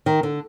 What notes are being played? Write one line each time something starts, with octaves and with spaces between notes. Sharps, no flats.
D#3
D3